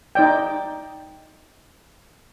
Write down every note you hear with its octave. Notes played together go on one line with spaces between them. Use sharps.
D#4 D5 G5